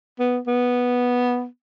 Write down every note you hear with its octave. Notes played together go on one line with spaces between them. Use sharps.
B3
B3